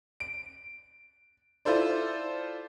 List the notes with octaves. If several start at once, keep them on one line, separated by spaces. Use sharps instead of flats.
D7
E4 F4 A4 C5 D5